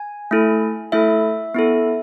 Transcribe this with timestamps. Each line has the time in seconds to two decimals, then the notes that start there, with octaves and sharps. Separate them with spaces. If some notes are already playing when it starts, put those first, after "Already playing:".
Already playing: G#5
0.31 A3 E4 A4
0.92 A3 E4 A4 E5
1.54 B3 E4 A4